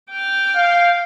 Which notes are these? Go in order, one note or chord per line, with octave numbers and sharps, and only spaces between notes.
G5 D6 F6
F5